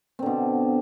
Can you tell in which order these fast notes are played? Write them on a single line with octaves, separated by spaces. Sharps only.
C4 D3 B2